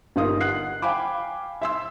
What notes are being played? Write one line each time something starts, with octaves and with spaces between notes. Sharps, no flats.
G1 D#4 F4 G4 A#4 D#6
F#5 F#6 C7
F5 G5 G#5 B5 D6
E5 C6 E6